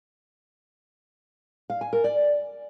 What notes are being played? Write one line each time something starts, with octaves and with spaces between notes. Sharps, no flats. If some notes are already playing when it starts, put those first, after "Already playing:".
F5
G#5
A#4
D5